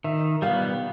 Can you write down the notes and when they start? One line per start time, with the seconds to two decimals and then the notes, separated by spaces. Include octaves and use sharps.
0.04 D#3 E5
0.42 G3 B3 F5